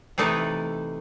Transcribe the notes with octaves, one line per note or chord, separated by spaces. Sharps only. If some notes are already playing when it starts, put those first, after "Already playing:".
C3 E3 A3 D#4 A4 B4